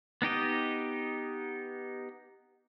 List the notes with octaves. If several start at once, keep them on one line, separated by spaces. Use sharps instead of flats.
B3 D#4 G4 D#5